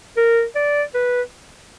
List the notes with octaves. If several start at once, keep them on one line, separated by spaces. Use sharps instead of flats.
A#4
D5
B4